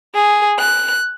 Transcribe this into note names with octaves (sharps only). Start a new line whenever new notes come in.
G#4
F#6